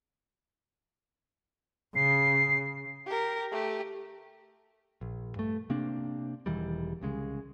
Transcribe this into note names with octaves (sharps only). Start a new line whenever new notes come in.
C#3 C7
G4 A#4
A3 G4
A#1
G2 A3
C3 A#3 C4 D4
E1 D#3 E3 G3
C2 C#3 G#3